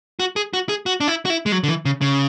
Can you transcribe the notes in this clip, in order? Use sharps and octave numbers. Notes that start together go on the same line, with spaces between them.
F#4
G#4
F#4
G#4
F#4
D4
E4
F#4
E4
G#3
F#3
D3
E3
C#3
C#3